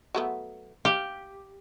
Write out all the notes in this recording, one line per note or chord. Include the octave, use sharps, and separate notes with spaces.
F#3 A3 B3
G4 F5